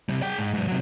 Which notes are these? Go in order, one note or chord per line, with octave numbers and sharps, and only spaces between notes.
C3 G3
G#4 G5
G#2
G#2 F#3
C3 F#3